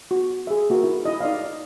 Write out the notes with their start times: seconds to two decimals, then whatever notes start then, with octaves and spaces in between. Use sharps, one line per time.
0.11 F#4
0.47 G#4 E5
0.70 A#3 F#4 A#4
0.84 E4
1.05 E4 D#5
1.21 D#4 D5 D#5 F5